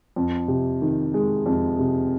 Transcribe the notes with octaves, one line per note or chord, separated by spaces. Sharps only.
F2
C3
D#3
G#3
F2
C3